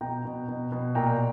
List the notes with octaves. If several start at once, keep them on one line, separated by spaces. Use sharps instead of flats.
B2 G5 A#5
B2
B2
B2
A#2 G5 A#5